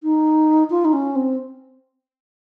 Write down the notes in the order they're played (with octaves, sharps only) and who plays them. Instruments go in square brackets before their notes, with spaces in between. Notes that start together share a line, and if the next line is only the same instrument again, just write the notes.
[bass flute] D#4
F4
D#4
C#4
C4